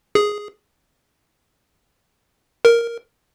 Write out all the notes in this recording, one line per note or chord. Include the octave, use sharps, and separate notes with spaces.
G#4
A#4